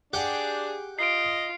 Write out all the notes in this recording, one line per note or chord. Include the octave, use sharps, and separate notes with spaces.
D4 G4 G#4 F#5 G5
F4 D#5 C7 D7